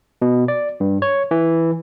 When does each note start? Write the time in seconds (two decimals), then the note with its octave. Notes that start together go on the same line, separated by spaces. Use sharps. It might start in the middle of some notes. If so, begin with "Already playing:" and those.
0.22 B2
0.48 D5
0.80 G2
1.02 C#5
1.31 E3